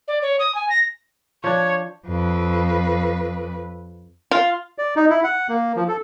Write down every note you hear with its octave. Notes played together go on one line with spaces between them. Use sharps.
D5
C#5
D#6
G#5
A#6
F3 D4 C#5
F2 B4
F4
D5
D#4
E4
F#5
A#3
F3
A4